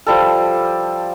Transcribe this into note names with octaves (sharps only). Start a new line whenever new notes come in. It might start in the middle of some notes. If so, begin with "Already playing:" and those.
F3 G3 A4